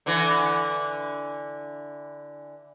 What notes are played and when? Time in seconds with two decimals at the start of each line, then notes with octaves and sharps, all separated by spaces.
0.06 D3 E3